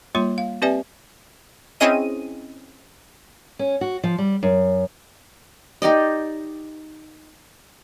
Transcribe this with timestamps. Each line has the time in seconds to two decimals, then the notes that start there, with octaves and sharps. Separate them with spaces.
0.15 G3 A#3 F4 C#5 C6
0.38 F5
0.62 C4 G4 B4 D5 E5 G#5
1.80 C4 C#4 E4 G#4 D#5 D#7
3.59 C#4
3.81 F#4
4.03 F3
4.18 G3
4.43 F#2
5.82 D#4 G4 D5 D#5